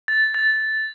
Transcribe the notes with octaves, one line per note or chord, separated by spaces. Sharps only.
A6
A6